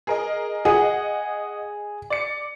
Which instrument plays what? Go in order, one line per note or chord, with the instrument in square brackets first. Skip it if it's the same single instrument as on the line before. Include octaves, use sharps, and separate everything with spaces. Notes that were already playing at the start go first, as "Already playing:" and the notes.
[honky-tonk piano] G#4 A#4 D#5
[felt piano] G#4 [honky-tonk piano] D#5 F#5
[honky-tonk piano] D5 C#7